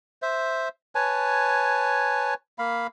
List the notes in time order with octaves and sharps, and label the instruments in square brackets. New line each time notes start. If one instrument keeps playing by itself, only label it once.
[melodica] C5 E5
B4 C#5 G#5 A5
A#3 F5 B5